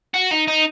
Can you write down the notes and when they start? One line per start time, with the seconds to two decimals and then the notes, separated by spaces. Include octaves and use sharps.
0.14 F#4
0.31 D#4
0.47 D#4